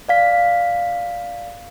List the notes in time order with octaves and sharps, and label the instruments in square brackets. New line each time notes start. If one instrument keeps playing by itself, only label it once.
[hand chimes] D5 F5 B6